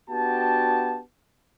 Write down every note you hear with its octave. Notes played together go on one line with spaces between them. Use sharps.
B3 D4 F#4 G4 G5 A5